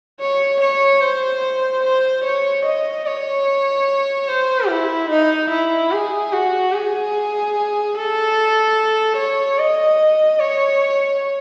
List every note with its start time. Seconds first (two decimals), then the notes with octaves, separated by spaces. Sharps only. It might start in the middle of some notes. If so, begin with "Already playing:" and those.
0.21 C#5
0.61 C#5
1.02 C5
1.84 C5
2.25 C#5
2.66 D#5
3.06 C#5
4.28 C5
4.69 E4
5.10 D#4
5.50 E4
5.91 G#4
6.33 F#4
6.73 G#4
7.95 A4
9.17 C#5
9.59 D#5
10.39 C#5